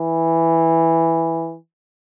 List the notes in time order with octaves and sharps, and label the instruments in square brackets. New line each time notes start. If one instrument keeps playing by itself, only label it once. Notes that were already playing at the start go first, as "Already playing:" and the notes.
Already playing: [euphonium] E3